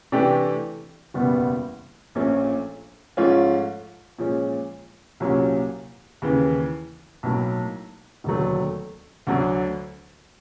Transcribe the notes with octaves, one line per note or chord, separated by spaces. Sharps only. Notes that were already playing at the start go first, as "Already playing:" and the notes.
C3 E3 A3 D4 G4
F#1 E2 B2 G3 B3
A#1 A#2 F3 A3 C#4
G#2 F3 A3 C#4 F4
A#2 F3 G#3 C#4
C2 A#2 F#3 A#3 C#4
D#2 C#3 E3
B1 A2 F#3 A#3
E1 D#2 D3 F#3 A3
D2 D3 F#3